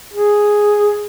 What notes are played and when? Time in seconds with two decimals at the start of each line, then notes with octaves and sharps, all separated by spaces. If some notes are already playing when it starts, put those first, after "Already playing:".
0.14 G#4